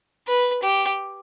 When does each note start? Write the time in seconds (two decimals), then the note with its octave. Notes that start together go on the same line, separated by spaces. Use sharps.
0.27 B4
0.63 G4